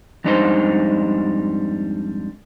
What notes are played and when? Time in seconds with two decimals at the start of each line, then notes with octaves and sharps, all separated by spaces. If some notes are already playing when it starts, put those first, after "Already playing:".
0.24 F2 G#2 G3 D4 D#4 C5